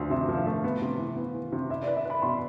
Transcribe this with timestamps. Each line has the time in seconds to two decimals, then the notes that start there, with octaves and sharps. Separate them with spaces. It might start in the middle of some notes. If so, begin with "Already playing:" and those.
Already playing: D2 F3
0.10 C3 E5
0.29 F3
0.38 F5
0.47 A3
0.64 B3
0.82 C3
0.99 E3
1.16 B3
1.34 E3
1.52 C3
1.70 E4 E5
1.83 D5
1.87 B4
1.97 E5
2.05 B4 B5
2.22 B2 C6